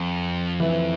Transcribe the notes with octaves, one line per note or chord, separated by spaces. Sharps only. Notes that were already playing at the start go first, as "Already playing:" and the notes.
Already playing: F2
E3